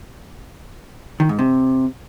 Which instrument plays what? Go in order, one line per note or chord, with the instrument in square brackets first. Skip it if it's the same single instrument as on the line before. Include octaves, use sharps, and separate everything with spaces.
[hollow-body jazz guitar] D#3
G#2
C3